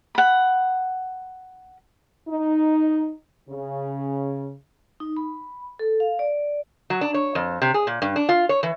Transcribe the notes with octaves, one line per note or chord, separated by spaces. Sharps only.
F#5 B5
D#4
C#3
D#4
B5
A4
F5
D5
F#3
D4
C#5
F2
C3
G#4
A#2
G2
D4
F4
C#5
E3